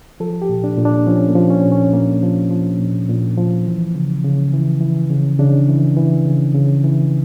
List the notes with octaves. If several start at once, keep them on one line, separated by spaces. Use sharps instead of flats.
F3 A4
G4
A#2
D4
A#2
D4
F3 C#4
A#3
F3
C#4
A#2
C#4
A#2 A#3
F3
F3
A#2
A#2
F3
E3
C#3
C#3
E3
E3
C#3
C#3 D4
E3
E3
C#3
C#3
E3